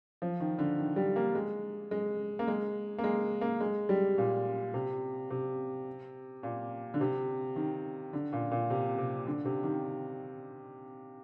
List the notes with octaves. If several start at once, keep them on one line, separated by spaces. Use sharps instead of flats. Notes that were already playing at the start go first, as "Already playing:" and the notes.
F3
D#3
D3
D#3
G3
A#3
G#3
G#3
A#3
G#3
A#3
G#3
A#3
G#3
G3
A#2
C3
C3
A#2
D3
C3
D#3
D3
A#2
A#2
C3
C3
D3
C3
D#3